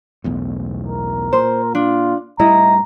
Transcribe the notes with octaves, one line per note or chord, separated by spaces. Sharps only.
B1 E2 A2
A#4
A#2 C5
D4 F4
A2 G3 E4 D#5 A#5